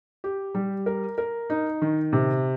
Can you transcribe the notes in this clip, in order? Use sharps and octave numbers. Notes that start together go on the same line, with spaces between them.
G4
G3
A#4
A#4
D#4
D#3
C3